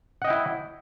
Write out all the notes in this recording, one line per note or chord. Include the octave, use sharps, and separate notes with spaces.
E4 D#5 F#5 G5